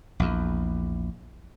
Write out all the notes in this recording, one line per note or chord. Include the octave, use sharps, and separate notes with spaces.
A#1 E2